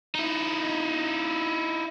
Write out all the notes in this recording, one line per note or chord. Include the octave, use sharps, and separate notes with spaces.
D#4 E4